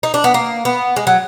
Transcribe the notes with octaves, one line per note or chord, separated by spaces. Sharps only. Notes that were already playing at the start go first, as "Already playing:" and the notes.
D#4
D4
B3
A#3
B3
G#3
F#3